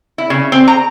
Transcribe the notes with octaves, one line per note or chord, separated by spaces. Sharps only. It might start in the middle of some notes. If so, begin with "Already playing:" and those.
E4
C#3
C4
A#5